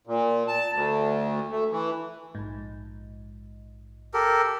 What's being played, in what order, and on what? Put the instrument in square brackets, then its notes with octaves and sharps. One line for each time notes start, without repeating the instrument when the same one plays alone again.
[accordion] A#2
A5
D2
A3
E3
[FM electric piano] A#1 G#2
[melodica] G4 A4 A#4